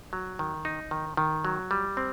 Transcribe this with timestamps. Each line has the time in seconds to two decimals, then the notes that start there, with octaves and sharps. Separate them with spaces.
0.13 F#3
0.39 D#3
0.65 D#4
0.91 D#3
1.17 D#3
1.45 F#3
1.71 G3
1.97 C4